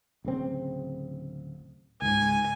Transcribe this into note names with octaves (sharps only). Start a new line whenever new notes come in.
D1 C#3 C4
C#2 G#2 G#5